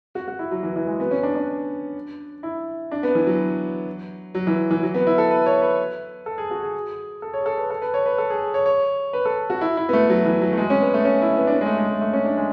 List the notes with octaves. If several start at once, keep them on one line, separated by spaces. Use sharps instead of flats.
F#4
F#4
E4
F#3
E3
E3
G#3
B3
C#4
D4
D4
E4
D4
B3
E3
F#3
F#3
E3
E3
F#3
B3
E4
A4
B4
C#5
B4
A4
G#4
F#4
G#4
A4
C#5
G#4
A4
B4
A4
B4
C#5
B4
A4
G#4
C#5
C#5
B4
A4
F#4
E4
E4
B3
A3
F#3
E3
F#3
A3
G#3
C#4
B3
A3
C#4
E4
B3
D4
C#4
G#3
A3
G#3
A3
A3
C#4
D4
G#3